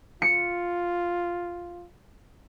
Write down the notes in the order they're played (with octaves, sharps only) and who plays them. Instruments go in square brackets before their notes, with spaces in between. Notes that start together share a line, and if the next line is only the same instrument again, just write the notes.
[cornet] F4 [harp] C#7